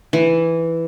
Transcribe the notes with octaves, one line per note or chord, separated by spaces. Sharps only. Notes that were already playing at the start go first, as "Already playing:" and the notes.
E3